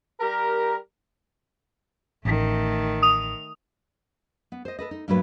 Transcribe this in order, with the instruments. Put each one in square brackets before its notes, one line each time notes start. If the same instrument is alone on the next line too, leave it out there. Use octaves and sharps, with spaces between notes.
[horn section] G3 G4 A#4
[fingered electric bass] A1 [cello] D#3 A3
[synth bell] D#6 F7
[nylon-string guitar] B3
C5 D#5
A4 B4 D#5
D#4
G2 A#2 F#3 A3 B4